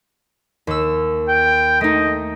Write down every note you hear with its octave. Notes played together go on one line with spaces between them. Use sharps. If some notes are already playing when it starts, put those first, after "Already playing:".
D#2 E6
G5
A3 D#4 D#5